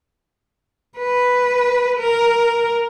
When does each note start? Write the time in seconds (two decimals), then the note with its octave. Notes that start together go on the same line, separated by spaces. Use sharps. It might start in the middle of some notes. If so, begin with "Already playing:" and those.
0.98 B4
2.01 A#4